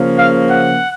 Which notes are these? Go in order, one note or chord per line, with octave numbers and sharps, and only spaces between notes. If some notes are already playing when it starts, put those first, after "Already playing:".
Already playing: C#3 F3 A#3 C#4
F5
F#5